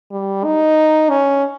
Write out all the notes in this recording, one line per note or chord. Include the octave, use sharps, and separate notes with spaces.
G3
D#4
C#4